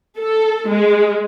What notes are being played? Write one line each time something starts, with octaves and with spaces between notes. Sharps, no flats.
A4
G#3